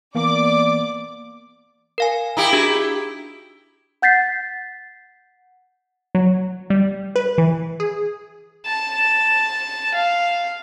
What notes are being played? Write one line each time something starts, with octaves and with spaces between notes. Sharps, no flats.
E3 A#3 B3 D5 D6
A#4 F5 G#5
D#4 E4 G4
D4 F#4 G#4
F#5 G6 A6 B6 C7
F#3
G3
B4
E3
G#4
A5
F5